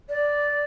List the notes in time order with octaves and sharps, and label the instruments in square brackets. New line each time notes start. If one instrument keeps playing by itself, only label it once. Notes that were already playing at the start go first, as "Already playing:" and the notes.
[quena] D5